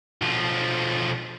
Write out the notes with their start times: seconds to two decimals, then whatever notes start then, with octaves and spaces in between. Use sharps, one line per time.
0.22 B1 F3